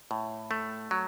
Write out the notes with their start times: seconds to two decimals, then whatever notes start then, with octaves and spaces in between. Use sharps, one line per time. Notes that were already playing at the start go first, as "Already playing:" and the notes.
0.11 A2
0.51 A3
0.91 F#3